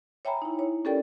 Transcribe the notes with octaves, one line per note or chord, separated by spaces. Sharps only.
C#5 E5 G5 G#5 A#5 B5
D#4 E4
C#5
C#4 G4 A4 A#4 D5 G5